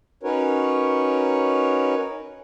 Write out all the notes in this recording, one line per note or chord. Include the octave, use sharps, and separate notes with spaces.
C#4 D#4 F#4 A#4 B4 C#5